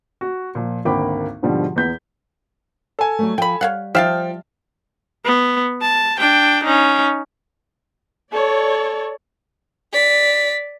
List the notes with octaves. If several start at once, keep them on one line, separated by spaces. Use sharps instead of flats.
F#4
A#2 F3
G#1 D2 A#3 G5 B5 D6
G#2 B2 D3 F3 G3
E2 B3 G6 B6
A4 G#5
F#3 G3 A3
F3 G5 B5
G3 C#5 F5 F#5
F3 E5 F5 G5 A5 F6
B3
A5
D4 G5
C#4 D#4
A4 C#5 D5
D5 B6